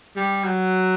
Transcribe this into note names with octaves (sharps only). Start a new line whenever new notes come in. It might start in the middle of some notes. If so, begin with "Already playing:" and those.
G3
F#3